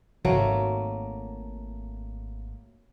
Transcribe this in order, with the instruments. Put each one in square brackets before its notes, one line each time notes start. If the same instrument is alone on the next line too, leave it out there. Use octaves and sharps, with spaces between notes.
[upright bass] G#1 [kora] F#3 A3 A#3